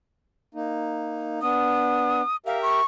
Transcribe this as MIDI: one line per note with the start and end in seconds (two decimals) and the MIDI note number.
0.54 1.39 58
0.54 1.39 63
1.41 2.22 59
1.41 2.22 62
1.41 2.36 87
2.46 2.80 67
2.46 2.80 70
2.46 2.80 76
2.46 2.61 77
2.62 2.85 85